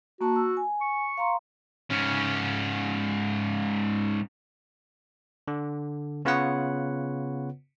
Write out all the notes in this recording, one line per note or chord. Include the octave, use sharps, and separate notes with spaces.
A#3 F#4 A5
E6
G#5
C#6
F5 A#5 C6
G#2 C#4
D3
C#3 B3 F4 B4 C#5 F#5